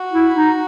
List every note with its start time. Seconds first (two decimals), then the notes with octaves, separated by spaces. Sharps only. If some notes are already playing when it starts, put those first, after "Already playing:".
Already playing: F#4
0.12 E4
0.35 D#4